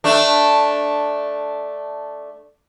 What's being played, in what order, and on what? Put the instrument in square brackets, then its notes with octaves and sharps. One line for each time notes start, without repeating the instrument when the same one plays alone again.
[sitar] A3 D4